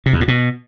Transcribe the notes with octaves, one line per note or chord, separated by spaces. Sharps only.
C3
E2
A2
B2